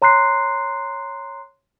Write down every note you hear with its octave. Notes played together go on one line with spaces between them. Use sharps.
C#5 A#5 C6 F#6 C7